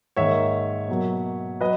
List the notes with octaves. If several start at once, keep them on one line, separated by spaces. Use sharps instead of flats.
G#2 D#3 A#3 C#5 E5
B2 F#3 A#3
F#3 B4 D#5